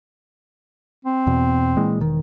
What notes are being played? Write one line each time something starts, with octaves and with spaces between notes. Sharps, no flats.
C4
E2 B2
A#2 E3 G#3
E1 D#3